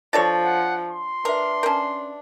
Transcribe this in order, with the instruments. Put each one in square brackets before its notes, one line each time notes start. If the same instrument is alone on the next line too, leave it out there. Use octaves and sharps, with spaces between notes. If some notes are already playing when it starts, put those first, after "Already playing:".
[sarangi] F3 [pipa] D4 A4 C#5 [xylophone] D5 A6 A#6
[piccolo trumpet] F#5
C6
[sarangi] D4 [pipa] A#4 [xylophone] B4 E5
[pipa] C#4 A#4 [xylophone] A5 G6